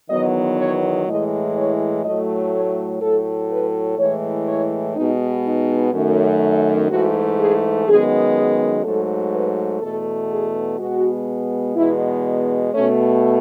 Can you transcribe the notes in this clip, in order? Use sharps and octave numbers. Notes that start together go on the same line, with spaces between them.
E2 D#3 F#3 B3 D#5
C#5
A2 E3 G#3 D#5
C#5
A2 F#3 A3 D#5
C#5
A2 F#3 A3 A4
B4
A2 E3 G#3 C#5
C#5
B2 G#3 B3 D#4
D#4
F#2 D#3 A3
G#2 E3 A3 F#4
G#4
F#2 D#3 G#3 B3 G#4
G#4
G#2 F#3 A3 A4
B4
E2 B2 A3 A4
G#4
B2 G#3 B3 F#4
E2 B2 G#3 B3 E4
B2 A3 C#4